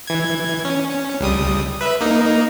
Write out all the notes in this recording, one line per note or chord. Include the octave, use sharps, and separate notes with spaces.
E3 G#6
C#4
C#2 G3 D#6
B4 E5
A#3 D#4